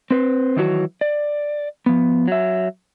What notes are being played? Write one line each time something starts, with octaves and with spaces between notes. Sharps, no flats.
C4 B4 C5
D#3 E3 F#3 F#4
D5
F3 B3
F#3 E5